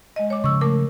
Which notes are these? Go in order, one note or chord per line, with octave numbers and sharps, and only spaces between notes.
G#3 D#5
C#5 D6
C#3 F3 C#6 E6
A3 A#4 D6